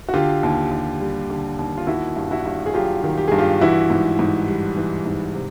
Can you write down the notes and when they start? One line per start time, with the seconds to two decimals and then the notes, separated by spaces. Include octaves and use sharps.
0.09 F#4
0.14 D3 F4 G4
0.43 D#2
0.71 D#2
1.01 G3
1.30 D3
1.59 D#2
1.78 F4
1.87 D#3 E4 F#4
2.16 G2
2.31 E4 F#4
2.45 G2
2.66 G#4
2.74 F#3 F4 G4
3.04 D#3
3.18 G4
3.28 G2 G#4
3.38 F4 G4
3.61 E3 E4 F#4
3.90 G#2
4.19 G#2
4.47 G3
4.77 E3
5.06 G#2
5.35 C3